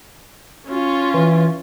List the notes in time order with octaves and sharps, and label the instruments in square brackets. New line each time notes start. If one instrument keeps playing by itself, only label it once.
[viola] C#4 F4
[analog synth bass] E3